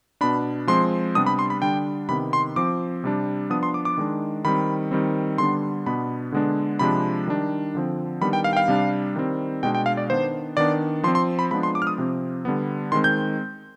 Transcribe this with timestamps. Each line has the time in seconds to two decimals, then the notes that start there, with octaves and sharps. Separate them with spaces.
0.21 B2 B3 D4 B5
0.67 F3 G#3 C4 C6
1.15 C3 G3 B3 D4 D#6
1.27 B5
1.39 C6
1.50 B5
1.62 D3 G3 D4 G5
2.09 C3 D#3 B3 B5
2.33 C6
2.56 F3 C4 D6
3.04 C3 G3 D4
3.50 F3 B3 D4 D#6
3.63 C6
3.74 D6
3.85 D6
3.98 D#3 G#3 D4
4.45 D#3 G3 C4 B5
4.91 D#3 G3 C4
5.38 D3 G3 B3 D4 C6
5.86 B2 B3 D4 B5
6.32 D3 G#3 B3 D4
6.79 C3 F3 G#3 D4 B5
7.28 D#3 G3 D4
7.75 D3 F3 C4
8.21 D#3 G3 B3 D4 B5
8.33 G5
8.44 F5
8.53 G5
8.57 F5
8.68 C3 G3 D4
9.16 D#3 G3 C4
9.63 B2 G#3 D4 G5
9.75 G5
9.86 F5
9.97 D5
10.10 D#3 B3 D4 C5
10.57 D#3 B3 D4 D5
11.03 F3 C6
11.08 C4
11.15 C6
11.39 B5
11.51 F3 G#3 B3 D4 B5
11.63 C6
11.75 D6
11.82 F6
11.87 D#6
11.98 C3 F3 C4
12.45 D3 G3 B3
12.92 D#3 G#3 C4 C6
13.04 G6